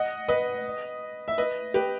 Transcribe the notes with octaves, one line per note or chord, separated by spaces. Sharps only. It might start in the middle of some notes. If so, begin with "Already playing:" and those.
Already playing: D#5 F#5
B4 D#5
E5
B4 D#5
G4 B4